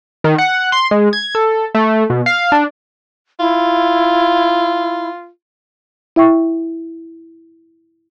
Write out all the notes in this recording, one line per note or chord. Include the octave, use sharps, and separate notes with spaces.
D#3
F#5
C6
G#3
G#6
A4
A3
B2
F5
D4
E4 F4
E4 E5 G5 C#6